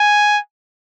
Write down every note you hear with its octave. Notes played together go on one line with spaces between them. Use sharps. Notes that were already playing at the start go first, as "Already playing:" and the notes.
Already playing: G#5